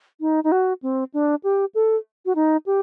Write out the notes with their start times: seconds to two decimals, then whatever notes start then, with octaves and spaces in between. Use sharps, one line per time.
0.20 D#4
0.44 D#4
0.52 F#4
0.82 C4
1.14 D4
1.43 G4
1.75 A4
2.26 F#4
2.35 D#4
2.66 G4